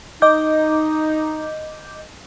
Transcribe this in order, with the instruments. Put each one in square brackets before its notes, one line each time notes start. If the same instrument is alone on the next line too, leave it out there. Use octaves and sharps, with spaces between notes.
[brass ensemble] D#4 [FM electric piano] D#5 D6 G6